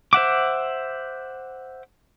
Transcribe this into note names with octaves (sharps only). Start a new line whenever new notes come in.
C5 E5 F#5 D6